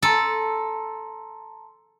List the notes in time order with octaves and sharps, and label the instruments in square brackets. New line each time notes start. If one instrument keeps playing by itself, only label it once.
[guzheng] A4 [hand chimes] A5 A#5 C6